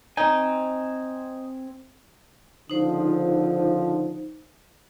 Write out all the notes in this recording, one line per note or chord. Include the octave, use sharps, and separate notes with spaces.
C4 D#4 G#5
C#2 D3 F3 D#4 C5